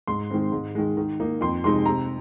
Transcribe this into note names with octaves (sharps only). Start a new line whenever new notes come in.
G#2 C6
D#3 G#3 C4
G#2
D#3 G#3
D#3
A#3 D#4
F2 C6
C3 G#3 D#4 C6
C3 A#5